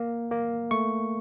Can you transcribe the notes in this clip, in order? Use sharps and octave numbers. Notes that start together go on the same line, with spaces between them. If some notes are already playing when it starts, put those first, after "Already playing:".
Already playing: A#3
A#3
A3 C#6